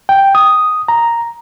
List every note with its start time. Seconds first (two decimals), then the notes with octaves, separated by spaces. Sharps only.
0.09 G5
0.35 D#6
0.88 A#5